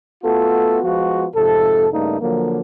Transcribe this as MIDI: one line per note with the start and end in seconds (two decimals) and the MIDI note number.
0.23 0.80 57
0.23 0.80 59
0.23 0.80 65
0.23 0.80 66
0.23 0.80 69
0.83 1.26 53
0.83 1.26 56
0.83 1.26 59
0.83 1.26 65
0.83 1.26 66
1.35 1.87 41
1.35 1.87 44
1.35 1.87 48
1.35 1.87 69
1.91 2.17 43
1.91 2.17 49
1.91 2.17 57
1.91 2.17 58
1.91 2.17 62
1.91 2.17 63
2.21 2.60 50
2.21 2.60 53
2.21 2.60 54
2.21 2.60 58